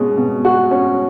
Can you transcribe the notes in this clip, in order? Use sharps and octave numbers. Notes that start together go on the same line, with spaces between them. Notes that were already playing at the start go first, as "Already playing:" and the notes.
Already playing: B2 G#3 C#4
B2
F#4
C#4